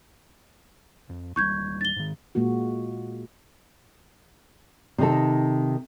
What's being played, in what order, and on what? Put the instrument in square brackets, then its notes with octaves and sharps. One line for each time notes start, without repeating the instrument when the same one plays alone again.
[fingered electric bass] F2
[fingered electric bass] D1 G3 [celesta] C#6 G6 G#6
[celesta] A6 G7
[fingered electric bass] G#2 D#3
[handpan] A#2 G#3 A#3 F#4
[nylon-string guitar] C3 D#3 D#4 A4